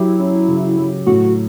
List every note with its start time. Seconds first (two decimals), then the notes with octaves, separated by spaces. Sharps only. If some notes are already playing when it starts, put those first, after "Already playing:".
Already playing: F#3 E4 G4
0.20 C#4
0.48 C#3
0.77 F#3
1.06 A2 F#4